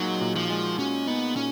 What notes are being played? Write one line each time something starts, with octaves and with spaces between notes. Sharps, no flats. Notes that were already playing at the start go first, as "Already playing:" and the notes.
Already playing: A#2 F#3 G#3 D#4 F#4
A#2
F3
G#3
C#4 F#4
B3 D#4
A#2 C#4